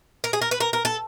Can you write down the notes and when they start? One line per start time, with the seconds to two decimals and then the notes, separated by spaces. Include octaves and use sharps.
0.24 A#4
0.33 G#4
0.42 A#4
0.51 B4
0.60 A#4
0.73 A#4
0.85 A4